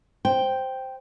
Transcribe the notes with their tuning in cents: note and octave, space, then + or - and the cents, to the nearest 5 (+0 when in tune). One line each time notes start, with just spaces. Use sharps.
C5 +0 G5 +0